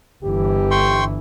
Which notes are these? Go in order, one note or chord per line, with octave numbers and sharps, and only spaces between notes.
G1 E3 G4
G5 C6 C#6